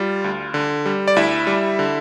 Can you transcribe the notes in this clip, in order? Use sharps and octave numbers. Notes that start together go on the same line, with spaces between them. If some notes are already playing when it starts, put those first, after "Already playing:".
Already playing: G3 F4
D2
D3
G3
D5
D2 E4 E5
G3
D3